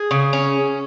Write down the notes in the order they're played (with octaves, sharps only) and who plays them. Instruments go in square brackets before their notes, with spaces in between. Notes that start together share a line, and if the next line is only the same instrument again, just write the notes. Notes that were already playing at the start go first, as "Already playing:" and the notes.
Already playing: [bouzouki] G#4
C#3
C#4